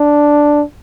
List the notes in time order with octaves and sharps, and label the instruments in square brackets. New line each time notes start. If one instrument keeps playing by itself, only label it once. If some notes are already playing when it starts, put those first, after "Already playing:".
Already playing: [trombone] D4